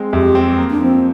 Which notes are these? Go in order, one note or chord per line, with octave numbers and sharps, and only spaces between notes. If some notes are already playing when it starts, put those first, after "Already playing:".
Already playing: G#3 C4
F2 G4
C4
A#3
D4
F3 C4